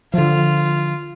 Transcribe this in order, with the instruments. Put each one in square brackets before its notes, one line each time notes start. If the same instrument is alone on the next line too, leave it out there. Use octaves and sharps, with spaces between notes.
[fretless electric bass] D3 F3 [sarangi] F4